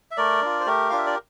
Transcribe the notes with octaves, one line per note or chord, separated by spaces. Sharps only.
E5
A3 A#4 D5
D4 F4
C5
A3 G4 A#4
D4 F4 F5
E5
D5